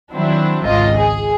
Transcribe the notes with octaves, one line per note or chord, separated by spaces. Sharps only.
D#3 F#3 C4 D4 E4
G#1 C#2 F4 D#5
G#4